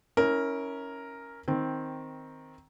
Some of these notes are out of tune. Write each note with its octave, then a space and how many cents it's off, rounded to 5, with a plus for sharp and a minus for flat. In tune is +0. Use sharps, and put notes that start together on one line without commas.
C#4 +0 E4 -30 A#4 +0
D#3 +5 C4 +0